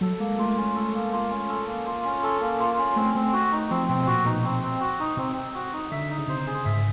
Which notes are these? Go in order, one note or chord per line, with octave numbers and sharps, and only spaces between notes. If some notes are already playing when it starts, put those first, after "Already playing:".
F#3 A4
G#3 A#3
A3 F4
C#4
A3 A4
A#3
F4
C#4
A4
A#3
F4
C#4
A4
A#3
F4
C#4
A3 C4
A3 C4
F#4
D#4
F3 C4
B2 C4
A#2 F#4
B2 D#4
C4
C4
F#4
D#4
C3 C4
C4
F#4
D#4
D3 E5
D#4
C#3
C3 C5
G#4
G#2 E5